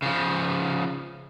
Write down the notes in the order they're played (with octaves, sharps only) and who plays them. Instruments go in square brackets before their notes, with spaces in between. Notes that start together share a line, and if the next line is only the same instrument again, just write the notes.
[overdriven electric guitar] C#3 F3